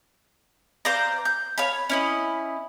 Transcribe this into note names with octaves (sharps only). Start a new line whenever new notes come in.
C5 D5 F5 A#5
G6
C#5 F5 B5
C#4 E4 D#5